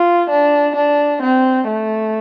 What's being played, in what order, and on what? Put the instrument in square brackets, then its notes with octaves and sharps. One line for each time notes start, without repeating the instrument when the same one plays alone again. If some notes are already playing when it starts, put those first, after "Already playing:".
Already playing: [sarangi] F4
D4
D4
C4
A3